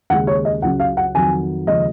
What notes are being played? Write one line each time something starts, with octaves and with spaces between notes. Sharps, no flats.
D#2 C#3 G#3 F#5
C#5
D#5
C#2 C#3 F#3 F#5
F5
F#5
F2 D#3 F#3 G#5
D#2 C#3 F3 G#3 D#5